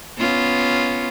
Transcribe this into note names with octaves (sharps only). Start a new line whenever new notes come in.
B3 C#4 F4